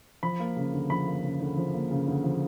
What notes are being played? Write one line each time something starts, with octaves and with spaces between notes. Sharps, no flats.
F3 B5
A#3
C#3
D2
F3 B5
A#3
C#3
D2
F3
A#3
C#3
D2
F3